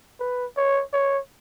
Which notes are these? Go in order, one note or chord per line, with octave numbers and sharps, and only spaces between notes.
B4
C#5
C#5